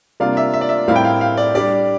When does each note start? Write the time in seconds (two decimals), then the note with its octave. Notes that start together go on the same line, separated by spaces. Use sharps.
0.20 C3 G3 A#3 D4 F4 F5
0.37 E5
0.54 E5
0.61 D5
0.69 E5
0.88 A2 G3 C4 E4 A#4 F5
0.96 G5
1.05 F5
1.21 F5
1.37 D5
1.55 G3 D4 G4 D5